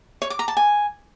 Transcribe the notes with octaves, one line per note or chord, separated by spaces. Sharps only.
C#5
D6
A#5
A5
G#5